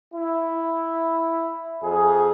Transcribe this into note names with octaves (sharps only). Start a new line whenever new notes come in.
E4
F2 G#4